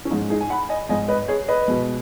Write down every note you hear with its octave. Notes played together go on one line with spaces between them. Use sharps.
C#4
G#2 G#3 D#4
D#4 G#4
G#5
F#5 B5
D#5 G#5
G#2 G#3 D#5 G#5
B4 D#5
G#4 C#5
B4 D#5
B2 G#3